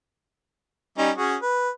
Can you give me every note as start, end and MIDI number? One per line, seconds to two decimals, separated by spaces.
0.98 1.11 55
0.98 1.11 61
0.98 1.11 63
1.18 1.36 61
1.18 1.36 66
1.18 1.36 68
1.42 1.70 71